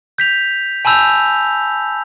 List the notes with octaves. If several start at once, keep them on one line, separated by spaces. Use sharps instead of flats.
G6 B6 F7
G#5 A5 B5 E6 G6 F7